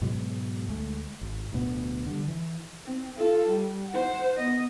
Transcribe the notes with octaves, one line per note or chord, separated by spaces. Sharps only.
G#2 B2 F#3 G#3
D2 G#3 A3
G#1
D1 D2 B2 B3
D3 G3
E3
C4
F4 A4
G3
C5 F#5
B3 D#5